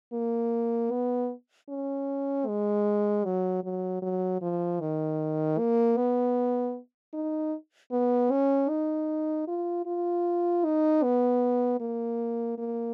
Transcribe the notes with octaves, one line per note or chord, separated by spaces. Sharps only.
A#3
B3
C#4
G#3
F#3
F#3
F#3
F3
D#3
A#3
B3
D#4
B3
C#4
D#4
F4
F4
D#4
B3
A#3
A#3